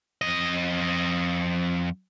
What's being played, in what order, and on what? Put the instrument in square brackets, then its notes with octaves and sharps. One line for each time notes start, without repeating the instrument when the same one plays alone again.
[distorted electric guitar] F2 D#5